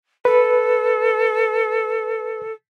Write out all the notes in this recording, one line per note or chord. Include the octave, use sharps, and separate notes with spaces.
A4 B4